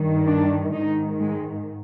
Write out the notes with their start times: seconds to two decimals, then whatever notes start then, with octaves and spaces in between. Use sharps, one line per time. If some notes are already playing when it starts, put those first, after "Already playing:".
Already playing: G2 D#3
0.27 D4
0.73 G#2 D#3 D#4
1.20 G#3